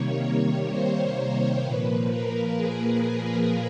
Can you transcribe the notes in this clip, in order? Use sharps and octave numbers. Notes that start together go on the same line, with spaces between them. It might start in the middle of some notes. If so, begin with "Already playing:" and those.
Already playing: C3 D#3 G3 A#3 C#5
C#5
C5
C5
A#2 F3 A#3 B4
A#4
G#4
A#4